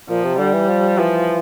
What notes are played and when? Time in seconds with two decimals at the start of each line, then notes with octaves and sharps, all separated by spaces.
0.10 A#2 F3
0.24 C3
0.39 D3 G3
0.54 E3
0.68 F3
0.98 E3 F3